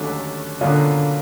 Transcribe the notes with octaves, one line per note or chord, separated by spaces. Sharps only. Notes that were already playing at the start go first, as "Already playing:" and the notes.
Already playing: D#2 D3 F#3 A3 C#4
B2 D3 F#3 A#3 C#4 F4